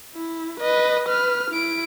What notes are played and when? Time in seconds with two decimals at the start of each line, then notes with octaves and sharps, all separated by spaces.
0.15 E4
0.60 B4 D#5
1.08 B4 F6
1.50 E4 D7